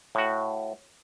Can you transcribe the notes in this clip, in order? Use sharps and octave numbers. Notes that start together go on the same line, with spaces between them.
A2 F#4